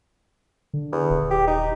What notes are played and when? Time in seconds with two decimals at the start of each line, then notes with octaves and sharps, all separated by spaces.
0.74 D3
0.92 E2
1.10 D#1
1.31 G4
1.47 D#4